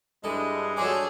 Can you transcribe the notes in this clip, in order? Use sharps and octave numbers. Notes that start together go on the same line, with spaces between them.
G2 G#3 D4 E4 A4
F#3 D4 G#4 A4 C5 G#5 D6